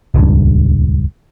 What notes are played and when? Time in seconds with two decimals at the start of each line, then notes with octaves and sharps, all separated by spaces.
0.14 D#1 C#2 G2